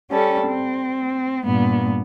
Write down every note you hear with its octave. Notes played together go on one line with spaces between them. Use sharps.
G3 C#4 A4
C4
G2 A#2 B3